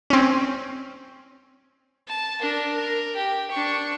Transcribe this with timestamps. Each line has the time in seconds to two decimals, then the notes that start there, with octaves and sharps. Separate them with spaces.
0.10 C4 C#4
2.08 A5
2.41 D4 A#4
2.75 A#4
3.16 G4
3.51 D4 C#6